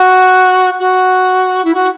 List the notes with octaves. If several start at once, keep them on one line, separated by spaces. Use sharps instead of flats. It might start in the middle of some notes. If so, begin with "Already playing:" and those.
Already playing: F#4
F#4
E4
F#4